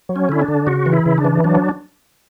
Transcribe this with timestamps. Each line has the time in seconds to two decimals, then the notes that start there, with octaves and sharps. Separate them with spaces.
0.09 F#3
0.16 C#4
0.29 D3 E4
0.42 D4
0.48 D3
0.67 C#3 F#4
0.86 E3
0.92 E4
1.06 C#3
1.18 D4
1.25 E3
1.44 F#3 D4